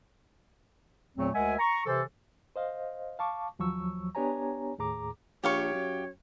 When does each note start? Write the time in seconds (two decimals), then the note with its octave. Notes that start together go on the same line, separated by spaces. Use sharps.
1.17 E2 A#2 F#3 A3 C4
1.34 D2 G#3 A#4 E5 F#5 G#5
1.58 A#5 C#6
1.86 C3 E3 A4 C5
2.56 C5 D#5 F5
3.19 F5 A5 C#6 D6
3.59 D#2 F3 F#3 C#6 E6
4.15 B3 D4 G4 C#5 G#5 A#5
4.78 D#2 A2 G#4 A#5 D6
5.43 A#1 G4 C#5 F5 C#6
5.74 F#2